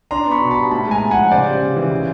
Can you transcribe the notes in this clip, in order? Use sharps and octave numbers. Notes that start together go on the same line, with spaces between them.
D4 A#5 C6
B3
B5 C#6
B2
A5 B5
G3
A2 A5 B5
G#3 G#5 A#5
A2
F3 F#5 G#5
C#3 C5 D5
G3
C#3
E3
C#3